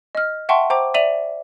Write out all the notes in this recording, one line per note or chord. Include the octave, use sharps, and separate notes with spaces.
D#5 F6
E5 F#5 G5 A5 C6 C#6
C5 G5 A#5 D6
D5 E5 D#7 F7 F#7